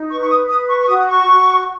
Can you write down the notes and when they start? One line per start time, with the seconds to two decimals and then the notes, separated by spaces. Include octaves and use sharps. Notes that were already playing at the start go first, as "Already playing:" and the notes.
Already playing: D#4
0.10 B4 C#6
0.21 C#6
0.30 D#6
0.49 B4 D#6
0.68 C#6
0.82 C#6
0.88 F#4 D#6
0.99 D#6
1.08 C#6
1.27 F#4